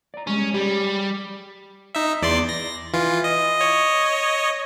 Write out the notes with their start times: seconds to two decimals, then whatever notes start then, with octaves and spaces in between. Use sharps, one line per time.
0.14 D5 A#5
0.27 G3 G#3 C#4 G#4
0.54 G3 G4 G#4
1.95 D#4 E5
2.22 E2 D5 C6
2.49 A#6
2.94 E3 F4
3.24 D#5
3.60 C#5 D#5